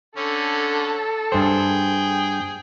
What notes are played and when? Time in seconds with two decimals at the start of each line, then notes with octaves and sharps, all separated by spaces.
0.17 D3 C#4 A4
1.32 G2 G#4 C5 G5